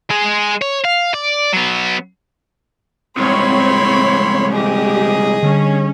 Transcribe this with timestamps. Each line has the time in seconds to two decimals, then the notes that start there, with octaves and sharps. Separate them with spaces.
0.11 G#3 G#4
0.62 C#5
0.85 F5
1.14 D5
1.53 F#3 B3
3.17 C2 G#2 C4 C#5 B5 C6
4.51 G4 G#4 D#5
5.43 D3 G3 C#4